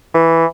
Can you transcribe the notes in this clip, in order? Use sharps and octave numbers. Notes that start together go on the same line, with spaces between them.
E3